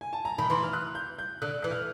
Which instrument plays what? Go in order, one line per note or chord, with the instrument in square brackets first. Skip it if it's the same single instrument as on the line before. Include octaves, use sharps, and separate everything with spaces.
[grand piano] G#5
A5
A#5
[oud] D#3 [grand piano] B5
[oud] E3 [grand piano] C6
[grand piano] F6
F#6
G6
G6
[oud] D3 [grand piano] F#6
[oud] E3 [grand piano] F#6
[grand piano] F6